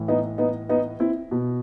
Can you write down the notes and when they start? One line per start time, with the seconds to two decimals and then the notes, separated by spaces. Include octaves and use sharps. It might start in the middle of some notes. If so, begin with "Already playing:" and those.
Already playing: A2 E3
0.08 B3 D#4
0.38 B3 D#4
0.69 B3 D#4
1.00 C4 E4
1.31 B2